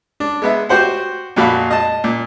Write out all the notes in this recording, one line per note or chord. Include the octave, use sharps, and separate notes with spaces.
D4
G#3 B3 E5
F#4 G4 C5 F#5
F2 A#2 F#4 F5 B5
D#5 A5
A#2